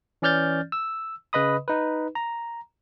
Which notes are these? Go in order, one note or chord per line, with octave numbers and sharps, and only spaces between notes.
E3 C#4 D5 F6 G6 A6
E6
C#3 B4 D#5 B5 D#6
D#4 B4
A#5